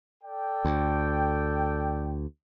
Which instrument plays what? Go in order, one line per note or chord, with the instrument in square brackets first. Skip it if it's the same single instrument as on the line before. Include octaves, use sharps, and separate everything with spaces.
[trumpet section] A4 D5 G5
[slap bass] D2